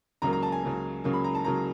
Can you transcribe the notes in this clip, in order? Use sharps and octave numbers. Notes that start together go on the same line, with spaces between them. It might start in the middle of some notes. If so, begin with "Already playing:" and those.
C#2 C#3 F#3 A#3 A#5
A#5
A5
G#5
C#2 C#3 F#3 A#3
C#2 C#3 F#3 A#3
B5
A#5
A5
C#3 F#3 A#3 A#5